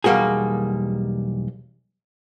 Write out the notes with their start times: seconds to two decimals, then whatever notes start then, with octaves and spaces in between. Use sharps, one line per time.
0.04 B1 E2 G3 A#3 F#4 G#4